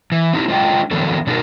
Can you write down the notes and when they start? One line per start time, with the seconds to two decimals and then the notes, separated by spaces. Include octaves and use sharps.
0.12 E3
0.33 C4 D#4 E4 G4
0.48 G#3 D4 F4 D#5 G5
0.91 D#3 F3 F#3 B3 D4 A4
1.27 B2 D4 D#4 F#4 G#4 A#4